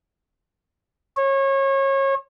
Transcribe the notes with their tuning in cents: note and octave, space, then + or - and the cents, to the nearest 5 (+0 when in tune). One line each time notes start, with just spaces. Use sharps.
C#5 -30